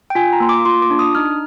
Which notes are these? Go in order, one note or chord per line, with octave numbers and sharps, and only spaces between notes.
G5
F4 G#5
A#5
A#3 C6
D6
F4 C6
D6
D4
D#6
D#4 F6